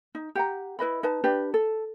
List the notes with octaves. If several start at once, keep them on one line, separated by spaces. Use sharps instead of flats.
D#4
G4 F#5 A#5
E4 B4 D#5 B5
D#4 B4 A5
D4 G4 B4
A4